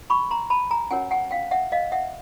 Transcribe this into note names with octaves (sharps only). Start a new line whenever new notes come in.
B5 C#6
A#5 C6
A5 B5
G#5 A#5
C#4 F#4 A#4 C#5 F#5 G#5
F#5 G#5
F5 G5
E5 F#5
D#5 F5
E5 F#5